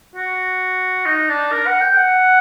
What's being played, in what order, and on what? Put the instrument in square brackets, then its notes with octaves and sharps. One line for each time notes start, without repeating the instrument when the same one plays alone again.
[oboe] F#4
D#4
D4
A#4
F#5
G5
F#5